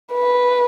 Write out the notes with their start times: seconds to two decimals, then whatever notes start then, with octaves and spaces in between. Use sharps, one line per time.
0.12 B4